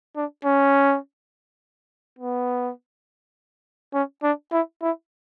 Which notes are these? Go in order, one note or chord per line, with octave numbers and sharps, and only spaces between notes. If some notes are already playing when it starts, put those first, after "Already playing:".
D4
C#4
B3
C#4
D4
E4
E4